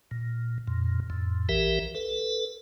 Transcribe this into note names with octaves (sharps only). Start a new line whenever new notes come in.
A#2
F2 A#2
F2 A2
A#1 E3 G4 A#4 E5
A4 B4